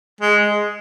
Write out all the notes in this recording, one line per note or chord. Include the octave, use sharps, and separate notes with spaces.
G#3